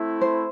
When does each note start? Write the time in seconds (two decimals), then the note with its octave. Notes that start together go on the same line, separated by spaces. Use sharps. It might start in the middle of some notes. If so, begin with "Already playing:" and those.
Already playing: A3 C4 E4
0.21 C5